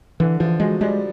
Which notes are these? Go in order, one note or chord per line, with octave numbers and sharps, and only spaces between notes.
D3 E3
E3 F3
F#3 G#3
G3 G#3